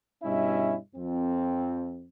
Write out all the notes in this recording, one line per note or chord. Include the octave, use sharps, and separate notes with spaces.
G2 B2 C#4 E4 D#5 E5
F2 C4